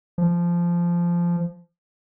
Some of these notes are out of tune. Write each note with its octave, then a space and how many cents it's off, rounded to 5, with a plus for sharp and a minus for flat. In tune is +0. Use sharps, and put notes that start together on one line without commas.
F3 -15